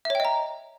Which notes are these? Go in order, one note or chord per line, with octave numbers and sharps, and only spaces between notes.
C#5 D#5 E5 G5 A#5